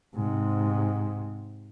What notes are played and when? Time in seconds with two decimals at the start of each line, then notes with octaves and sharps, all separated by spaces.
0.16 G#2 C3